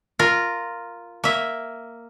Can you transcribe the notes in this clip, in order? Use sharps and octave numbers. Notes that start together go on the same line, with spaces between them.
F4 A#4
A#3 E5